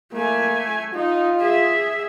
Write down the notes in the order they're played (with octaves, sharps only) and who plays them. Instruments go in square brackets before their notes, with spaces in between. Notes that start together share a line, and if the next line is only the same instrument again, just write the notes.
[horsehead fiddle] A3 G#5 [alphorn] A#3
[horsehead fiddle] D#4 [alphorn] F4
[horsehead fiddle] G#4 E5